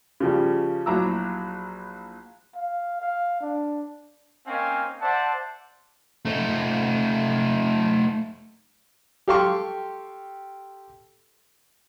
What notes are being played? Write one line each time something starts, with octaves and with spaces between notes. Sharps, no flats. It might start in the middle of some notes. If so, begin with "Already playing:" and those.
C#3 F3 G3
A#1 F#3 E4 A#5 D6 E6
F5
F5
D4
A#3 C4 C#4 D#4 F5 G#5
C5 D5 E5 F#5 A5
A3 D#4
G4 A4 F5 G5 C6 C#6